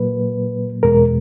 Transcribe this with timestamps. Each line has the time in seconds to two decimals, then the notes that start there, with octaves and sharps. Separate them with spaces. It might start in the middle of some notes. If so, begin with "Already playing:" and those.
Already playing: A#2 F#3 A#3 B4
0.83 E2 B2 G#3 A#4